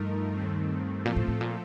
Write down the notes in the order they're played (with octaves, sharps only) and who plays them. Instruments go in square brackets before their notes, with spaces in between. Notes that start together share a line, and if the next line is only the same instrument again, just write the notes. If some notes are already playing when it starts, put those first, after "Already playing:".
Already playing: [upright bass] G2 [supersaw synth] F3 A3 D#4 A#4
[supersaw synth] D#2 D#3 A3 C4
[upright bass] A#2 [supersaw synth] F3 A3 C4 F4 A4
[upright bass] A2
A2
A#2